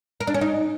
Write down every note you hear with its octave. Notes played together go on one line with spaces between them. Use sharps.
A#4
D4
C#4
D#4